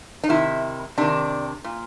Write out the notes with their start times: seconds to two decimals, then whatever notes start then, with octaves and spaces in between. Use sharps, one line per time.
0.24 D#4
0.29 C3 D#3 E4
0.98 C3 D#3 D4
1.64 A#2